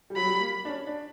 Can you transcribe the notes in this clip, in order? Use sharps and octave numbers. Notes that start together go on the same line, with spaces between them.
G3
F#3 B5
G3
A#3
D4
C#4
D4